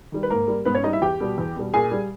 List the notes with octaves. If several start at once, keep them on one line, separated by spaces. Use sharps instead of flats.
D#3 G3
B4
G#2 A#3 A#4
G3
G#2 B3 B4
C#4 C#5
G3 D#4 D#5
E4 E5
E2 G4 G5
B2 G3
E2
B2 G3
A#2 G#4 G#5
G3